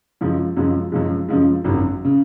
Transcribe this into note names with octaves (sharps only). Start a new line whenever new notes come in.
F#2 C#3 F3 G#3
F#2 C#3 F3 G#3
F#2 C#3 F3 G#3
F#2 C#3 F3 G#3
G#1 F#2 C#3
C#3